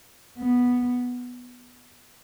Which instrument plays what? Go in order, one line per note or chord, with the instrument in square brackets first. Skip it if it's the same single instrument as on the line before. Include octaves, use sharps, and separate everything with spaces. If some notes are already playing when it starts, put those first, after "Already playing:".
[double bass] B3